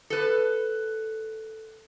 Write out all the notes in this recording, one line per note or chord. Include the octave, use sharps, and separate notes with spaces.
A4 B4